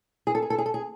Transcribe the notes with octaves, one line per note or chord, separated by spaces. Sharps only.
G#4
A4
G#4
A4
G#4
A4
G#4